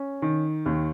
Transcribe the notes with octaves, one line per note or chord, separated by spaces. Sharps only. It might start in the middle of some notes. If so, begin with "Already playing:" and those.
Already playing: C#4
D#3
D#2